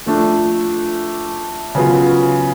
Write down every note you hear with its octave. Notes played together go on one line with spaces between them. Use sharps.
F3 A3 D4
C#3 F#3 B3 F4